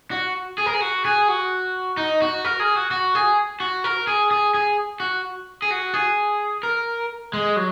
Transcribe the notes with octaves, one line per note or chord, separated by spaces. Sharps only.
F#4
G#4
A#4
G#4
F#4
G#4
F#4
D#4
F#4
A#4
G#4
F#4
F#4
G#4
F#4
A#4
G#4
G#4
G#4
F#4
G#4
F#4
G#4
A#4
G#3
F#3